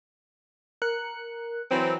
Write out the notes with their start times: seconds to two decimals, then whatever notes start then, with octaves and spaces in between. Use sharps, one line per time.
0.82 A#4 F#6 C#7
1.71 E3 F#3 C4